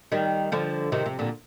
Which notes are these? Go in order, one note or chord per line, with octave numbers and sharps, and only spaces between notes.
D#3 G3
D3 F3
C3 D#3
C3
A#2 D3